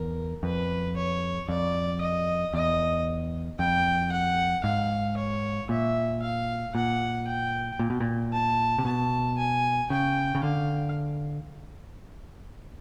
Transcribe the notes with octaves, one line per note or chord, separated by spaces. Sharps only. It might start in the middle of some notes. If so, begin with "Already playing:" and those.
Already playing: E2 A#4
F2 B4
C#5
F2 D5
D#5
E2 D#5
F2 G5
F#5
G#2 F5
C#5
A#2 E5
F5
A#2 F#5
G5
A#2
B2
A#2
A5
C3
B2 A5
G#5
C#3 G5
C#3
D3 F5